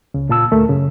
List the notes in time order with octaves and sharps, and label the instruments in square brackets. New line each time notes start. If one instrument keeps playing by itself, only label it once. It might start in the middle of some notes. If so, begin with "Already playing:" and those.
[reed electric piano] C#2 C#3
A#2 F4 A5 E6
D2 A3 A#4
F#2 C#3